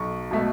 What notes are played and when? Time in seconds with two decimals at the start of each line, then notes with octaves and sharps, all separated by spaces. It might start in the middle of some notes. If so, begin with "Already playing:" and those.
Already playing: B1 C#6
0.31 B2 A3